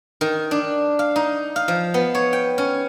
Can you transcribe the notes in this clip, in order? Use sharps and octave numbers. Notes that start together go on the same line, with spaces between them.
D#3
D4
F5
D#4
F5
F3
B3
C#5
G5
C#4